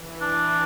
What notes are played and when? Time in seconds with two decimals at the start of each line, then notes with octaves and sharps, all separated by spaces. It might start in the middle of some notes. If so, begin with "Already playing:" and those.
Already playing: E3
0.21 D4